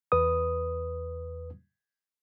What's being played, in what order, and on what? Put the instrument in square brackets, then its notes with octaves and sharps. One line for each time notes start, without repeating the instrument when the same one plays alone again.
[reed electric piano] E2 B4 D#6